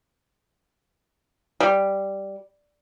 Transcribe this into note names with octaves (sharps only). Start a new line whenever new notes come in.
G3